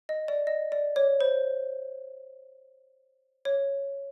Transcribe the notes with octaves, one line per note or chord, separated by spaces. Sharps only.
D#5
D5
D#5
D5
C#5
C5
C#5